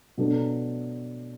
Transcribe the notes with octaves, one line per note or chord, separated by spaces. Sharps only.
B2 F#3 B3 D4 A4